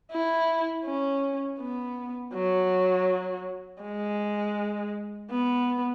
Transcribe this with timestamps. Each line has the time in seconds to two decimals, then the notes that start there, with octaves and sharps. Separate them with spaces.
0.11 E4
0.85 C#4
1.60 B3
2.34 F#3
3.82 G#3
5.31 B3